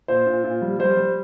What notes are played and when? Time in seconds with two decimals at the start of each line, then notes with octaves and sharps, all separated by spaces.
0.08 A#2 C5
0.26 A#2
0.44 A#2
0.62 G3
0.79 G3 C5
0.97 G3